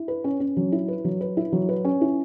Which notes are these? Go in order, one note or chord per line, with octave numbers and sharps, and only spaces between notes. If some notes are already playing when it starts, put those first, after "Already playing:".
Already playing: E4
B4
C#4
C#4
F#3
E4
B4
F#3
B4
E4
F#3
B4
C#4
E4